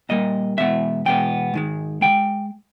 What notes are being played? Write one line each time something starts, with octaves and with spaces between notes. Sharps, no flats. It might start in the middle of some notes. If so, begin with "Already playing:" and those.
A#2 G3 A#3 D#5
E2 B2 G#3 B3 E5
E2 B2 G#3 B3 G5
G#2 D#3 G#3
D#3 G#3 G5